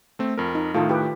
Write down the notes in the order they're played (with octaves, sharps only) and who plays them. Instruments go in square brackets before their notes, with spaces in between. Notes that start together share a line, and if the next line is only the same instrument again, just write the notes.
[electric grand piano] A3 C4
F2 A#4
[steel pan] D#4
[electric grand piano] A2 D#3 [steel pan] F4 A4
[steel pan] G4 B4